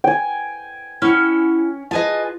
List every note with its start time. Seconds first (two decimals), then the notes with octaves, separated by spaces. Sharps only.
0.04 G5 G#5
1.02 C#4 E4 F#5
1.91 F4 G#4 B4 D#5 G#5 A5